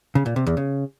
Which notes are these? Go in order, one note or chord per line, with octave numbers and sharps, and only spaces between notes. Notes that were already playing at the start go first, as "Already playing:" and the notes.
C#3
A#2
C3
E2
C#3